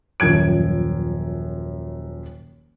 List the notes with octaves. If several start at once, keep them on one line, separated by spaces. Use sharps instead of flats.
D#1 F#2 F3 G#6 D7